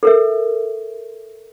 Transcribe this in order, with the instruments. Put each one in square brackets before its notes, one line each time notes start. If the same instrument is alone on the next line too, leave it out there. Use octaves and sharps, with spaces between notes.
[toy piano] A4 A#4 E5